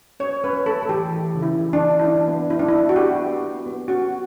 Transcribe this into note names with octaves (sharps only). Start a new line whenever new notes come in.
C#4 C#5
C#4 B4
A3 A4
A4
E3 G4
E3
C#3
E4
E3
D4
C#4
E4
E3 D4
B3
B3 E4
D4
E4
B3
F#4
B3 G4
B3
B3
B3
C#4 F#4